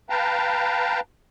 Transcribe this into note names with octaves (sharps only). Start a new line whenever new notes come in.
B4 F5 G5 A5 A#5